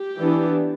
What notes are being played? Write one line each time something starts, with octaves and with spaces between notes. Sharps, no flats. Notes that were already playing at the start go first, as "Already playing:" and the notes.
Already playing: G4
E3 B3 D4